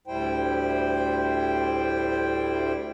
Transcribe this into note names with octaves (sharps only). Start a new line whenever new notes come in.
D2 A2 G3 E4 C5 G5